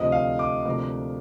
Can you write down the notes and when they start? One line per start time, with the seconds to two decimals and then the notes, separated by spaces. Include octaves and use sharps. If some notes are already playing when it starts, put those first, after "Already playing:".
Already playing: D2 C3 F3 D#5
0.12 F5
0.39 D6
0.65 D2 C3 F3 A#3 D6